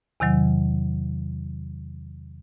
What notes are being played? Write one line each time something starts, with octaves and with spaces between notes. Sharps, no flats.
E2 C3 D#3 F#3